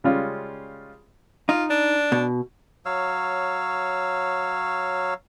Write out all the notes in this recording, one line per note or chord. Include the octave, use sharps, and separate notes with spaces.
C#3 G3 G#3 C#4 F4
D#4 F4
D4
B2
F#3 C#5 F5 E6